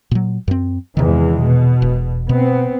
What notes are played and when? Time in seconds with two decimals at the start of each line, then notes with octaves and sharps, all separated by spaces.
0.11 A#2 F#3
0.48 F#2 C4
0.97 E2 C3 D#3 E3 G#3
1.42 B2
1.82 E1
2.29 B2 B3 C4